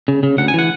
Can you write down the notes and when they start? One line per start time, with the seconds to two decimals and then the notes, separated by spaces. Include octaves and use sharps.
0.08 C#3
0.23 C#3
0.38 D2 F#5
0.48 G#5
0.54 E3 F#5